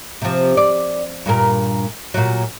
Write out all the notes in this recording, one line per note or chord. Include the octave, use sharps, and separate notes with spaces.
C3 F3
D5
G2 A#2 A#4
A#2 F#3